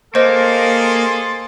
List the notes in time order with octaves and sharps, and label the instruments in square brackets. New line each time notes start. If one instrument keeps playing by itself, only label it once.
[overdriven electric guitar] A#3 [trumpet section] G#4 A4 C6 [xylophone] C5 D#5